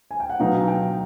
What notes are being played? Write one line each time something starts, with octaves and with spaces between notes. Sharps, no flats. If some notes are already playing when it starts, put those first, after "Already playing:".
G#5
G5
F#5
B2 F#3 B3 D#4 F5
G5